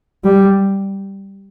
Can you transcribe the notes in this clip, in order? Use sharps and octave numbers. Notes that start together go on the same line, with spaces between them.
G3